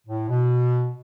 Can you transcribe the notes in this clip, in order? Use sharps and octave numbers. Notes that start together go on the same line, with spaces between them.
A2
B2